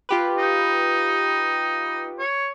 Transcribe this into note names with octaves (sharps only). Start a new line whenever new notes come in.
F4 G4 B4
D#4
C#5